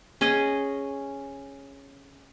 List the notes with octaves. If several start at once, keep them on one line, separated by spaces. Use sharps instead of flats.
C#4 G#4 D#5